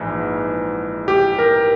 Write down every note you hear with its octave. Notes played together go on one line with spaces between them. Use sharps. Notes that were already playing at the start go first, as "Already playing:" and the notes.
Already playing: A#1 G#2 E3
G4
A#4